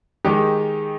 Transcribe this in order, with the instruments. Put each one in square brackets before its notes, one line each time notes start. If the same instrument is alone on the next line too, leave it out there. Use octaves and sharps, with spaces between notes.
[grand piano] D#3 G#3 D#4 G4